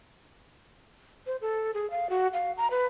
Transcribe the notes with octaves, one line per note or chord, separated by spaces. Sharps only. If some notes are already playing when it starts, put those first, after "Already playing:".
C5
A4
G#4
F5
F#4
F5
A#5
B4